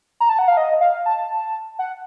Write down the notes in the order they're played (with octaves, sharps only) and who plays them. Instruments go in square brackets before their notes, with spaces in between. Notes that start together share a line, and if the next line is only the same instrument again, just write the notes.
[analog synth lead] A#5
A5
F#5
F5
D#5
F5
A5
F#5